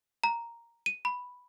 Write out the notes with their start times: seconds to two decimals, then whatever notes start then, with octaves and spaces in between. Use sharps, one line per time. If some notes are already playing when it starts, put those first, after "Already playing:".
0.24 A#5
0.86 D#7
1.05 B5